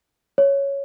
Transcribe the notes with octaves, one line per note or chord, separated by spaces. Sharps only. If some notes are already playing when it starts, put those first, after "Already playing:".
C#5